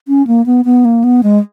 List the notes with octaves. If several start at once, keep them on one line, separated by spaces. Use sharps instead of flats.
C#4
A#3
B3
B3
A#3
B3
G#3